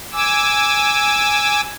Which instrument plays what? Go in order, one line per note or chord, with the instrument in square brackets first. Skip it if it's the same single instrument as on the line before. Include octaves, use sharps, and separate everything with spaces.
[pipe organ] G#5 D6 E6